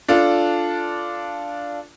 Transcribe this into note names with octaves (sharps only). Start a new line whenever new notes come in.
D4 F4 A4